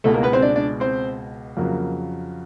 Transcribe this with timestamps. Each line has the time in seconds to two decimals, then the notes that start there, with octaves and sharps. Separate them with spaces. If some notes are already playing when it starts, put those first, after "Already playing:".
0.04 C#2 B2 G#3 A3 A4
0.14 A#3 A#4
0.23 B3 B4
0.33 C4 C5
0.42 D4 D5
0.56 D4 D5
0.80 C4 C5
1.57 F2 C#3 F#3 A#3